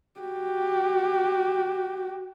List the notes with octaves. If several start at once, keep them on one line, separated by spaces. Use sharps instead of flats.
F#4 G4